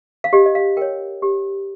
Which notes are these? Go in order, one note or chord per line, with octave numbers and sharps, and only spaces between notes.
F5
G4 D#5
D#5
F5
A#4 C#5 G5
G4